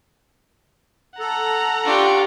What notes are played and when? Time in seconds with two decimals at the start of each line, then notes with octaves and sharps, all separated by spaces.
1.19 A4 F#5 A#5
1.85 D4 F4 G4 C#6